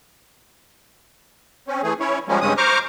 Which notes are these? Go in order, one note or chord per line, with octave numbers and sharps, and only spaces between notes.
C4 C#4
E3 A3 G#4
C#4 E4 C#5
F3 G3 G#3 A#3 C#4
G2 C#3 G#3 C4 C#4 D#6
C5 A#5 C#6 D6 F6